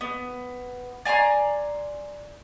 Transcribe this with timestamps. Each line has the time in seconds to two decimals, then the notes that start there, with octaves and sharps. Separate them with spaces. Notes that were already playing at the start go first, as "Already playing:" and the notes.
0.01 B3
1.05 D5 G#5 A#5 C6